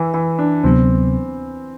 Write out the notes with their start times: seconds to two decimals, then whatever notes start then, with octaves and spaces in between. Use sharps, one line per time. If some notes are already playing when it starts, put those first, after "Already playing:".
Already playing: E3
0.14 E3
0.39 D4
0.63 D2 C3 F#3 B3 C4